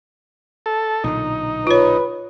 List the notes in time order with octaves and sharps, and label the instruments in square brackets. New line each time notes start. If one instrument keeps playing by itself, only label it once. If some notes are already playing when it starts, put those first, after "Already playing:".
[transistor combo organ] A4
[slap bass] B1 A#2 D3 [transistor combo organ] D#4
[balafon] F4 C#5 [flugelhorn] B4